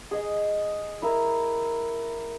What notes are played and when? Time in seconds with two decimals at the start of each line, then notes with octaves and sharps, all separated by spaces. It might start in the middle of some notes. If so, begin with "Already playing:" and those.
0.11 G#4 D#5
1.02 E4 A#4